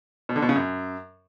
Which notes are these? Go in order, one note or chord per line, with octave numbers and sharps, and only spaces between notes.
B2
D3
B2
C#3
F#2